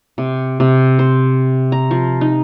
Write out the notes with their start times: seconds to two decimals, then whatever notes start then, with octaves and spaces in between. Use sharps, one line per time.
0.18 C3
0.60 C3
0.99 C5
1.72 A#5
1.91 F3
2.21 D#4